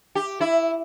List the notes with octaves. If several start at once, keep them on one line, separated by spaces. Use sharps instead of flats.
G4
E4